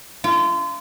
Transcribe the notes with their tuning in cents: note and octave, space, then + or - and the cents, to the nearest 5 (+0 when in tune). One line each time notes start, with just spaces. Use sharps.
F4 -30